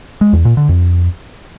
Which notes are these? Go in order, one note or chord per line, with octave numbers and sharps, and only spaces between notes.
G#3
E2
A#2
D3
F2